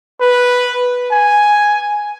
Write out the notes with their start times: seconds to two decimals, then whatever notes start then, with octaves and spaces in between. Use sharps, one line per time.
0.21 B4
1.11 G#5